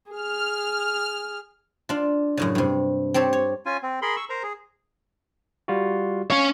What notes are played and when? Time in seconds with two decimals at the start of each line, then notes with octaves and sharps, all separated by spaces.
0.11 G#4 F6
1.89 D4 F4
2.37 F#2 A2 C#3
2.55 G2 C3
3.14 C4 G4 A4 C#5
3.33 C#5
3.66 C#4 F4 G#5
3.83 C4
4.02 G#4 A#4 B5 C6
4.16 C#6 E6
4.30 A#4 C5 A#5
4.43 G#4
5.68 G3 F4 F#4
6.30 C#4 C#5 F5